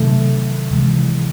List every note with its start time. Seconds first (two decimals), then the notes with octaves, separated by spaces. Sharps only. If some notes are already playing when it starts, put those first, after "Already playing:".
Already playing: C3 D#3 F#3 A3 A4
0.71 C3 E3 G#3